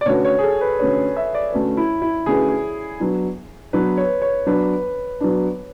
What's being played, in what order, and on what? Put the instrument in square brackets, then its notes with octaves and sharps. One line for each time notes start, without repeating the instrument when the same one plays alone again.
[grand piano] D5
[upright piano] D3 A3 C#4 F#4 B4 [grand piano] C#5
[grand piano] C#5
G#4
A4
B4
[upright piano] D3 A3 C#4 F#4 B4 [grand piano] C#5
[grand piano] E5
D5
[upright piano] D3 A3 C#4 F#4 B4
[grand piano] E4
E4
[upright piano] D3 A3 C#4 F#4 B4 [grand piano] G#4
[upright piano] F#3 B3 D4
[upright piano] F#3 B3 D4 [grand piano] B4
[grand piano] C#5
C#5
[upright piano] F#3 B3 D4 [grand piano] B4
[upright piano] F#3 B3 D4